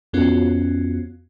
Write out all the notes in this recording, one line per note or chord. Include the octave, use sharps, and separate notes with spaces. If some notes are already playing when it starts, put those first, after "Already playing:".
F2 B3 C#4 F4 F#4